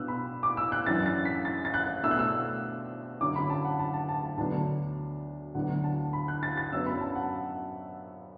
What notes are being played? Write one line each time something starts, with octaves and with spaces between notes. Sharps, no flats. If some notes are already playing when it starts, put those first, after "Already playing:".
Already playing: B2 B3 D4 E6 F#6
B5
D6
E6
F#6
F#2 E3 D4 A6
A6
B6
A6
A6
F#6
B2 A3 D4 E6
F#6
E6
F#2 D3 F#3 D6
B5
A5
F#5
A5
A5
A5
A5
D2 D3 F#3 B3 D4 A5
D2 D3 F#3 B3 D4 F#5
A5
B5
F#6
A6
A6
F#2 F#3 B3 D4 E6
B5
A5
F#5